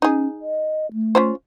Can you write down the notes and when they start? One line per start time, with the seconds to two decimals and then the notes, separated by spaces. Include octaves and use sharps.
0.02 C#4 D#4 G#4
0.41 D#5
0.93 A3
1.15 C#4 F4 C5